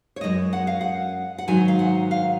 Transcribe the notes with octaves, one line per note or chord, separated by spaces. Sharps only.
C#5
F#2 D#3 G#3 D#5
F#5
F5
F#5
F#5
G#2 D#3 F#3 G#5
F5
F#5
F5